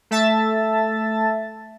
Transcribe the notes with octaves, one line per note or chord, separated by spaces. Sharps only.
A3 E5 A5 A6